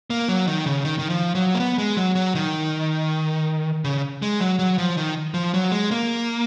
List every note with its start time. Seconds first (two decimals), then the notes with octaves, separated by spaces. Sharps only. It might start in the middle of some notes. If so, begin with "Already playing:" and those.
0.10 A#3
0.28 F#3
0.47 D#3
0.66 C#3
0.85 D#3
0.99 D#3
1.10 F3
1.35 F#3
1.55 A#3
1.60 B3
1.78 G#3
1.97 F#3
2.15 F#3
2.35 D#3
3.84 C#3
4.22 G#3
4.40 F#3
4.59 F#3
4.78 F3
4.97 D#3
5.34 F3
5.54 F#3
5.72 G#3
5.91 A#3